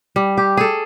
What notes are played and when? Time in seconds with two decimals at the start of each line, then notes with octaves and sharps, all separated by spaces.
0.16 G3
0.37 G4
0.57 G#4 A4